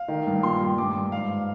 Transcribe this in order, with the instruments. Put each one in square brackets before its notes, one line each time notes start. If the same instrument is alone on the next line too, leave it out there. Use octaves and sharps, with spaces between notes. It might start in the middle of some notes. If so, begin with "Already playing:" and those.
Already playing: [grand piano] F5
D#3
G2
A#2 C6
G3
G2 D6
G2
G#2 F5